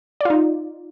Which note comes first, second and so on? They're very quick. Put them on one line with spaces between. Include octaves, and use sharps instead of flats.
D5 F4 D#4